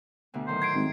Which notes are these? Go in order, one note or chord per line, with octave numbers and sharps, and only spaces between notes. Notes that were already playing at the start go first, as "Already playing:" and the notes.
D2 B2 D3
A2 D#3 F#3 C5
G#6 C7 D7
G#1 G5